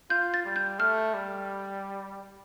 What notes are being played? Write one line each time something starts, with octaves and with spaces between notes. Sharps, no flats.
F4 G6
A6
G3
G6
A3 F6
G3